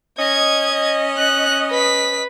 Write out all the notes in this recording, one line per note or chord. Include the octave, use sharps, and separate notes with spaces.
C#4 D#5 G#6
F#6
B4 B6